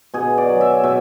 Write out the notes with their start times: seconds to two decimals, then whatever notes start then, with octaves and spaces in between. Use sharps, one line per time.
0.14 B2 G#4
0.38 D5
0.48 F#3
0.61 E5
0.84 B2 E5